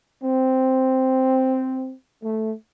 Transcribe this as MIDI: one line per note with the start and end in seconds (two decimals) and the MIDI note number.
0.22 1.93 60
2.23 2.52 57